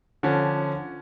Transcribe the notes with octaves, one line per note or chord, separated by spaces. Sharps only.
D3 F3 C#4